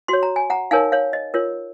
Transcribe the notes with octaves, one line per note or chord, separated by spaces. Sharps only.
F#4 C#5 C6
A#5
G#5
F#5 A#5
D#4 A#4 C#5 F5 G#5
C#5 F5
D#5
F4 A#4 C#5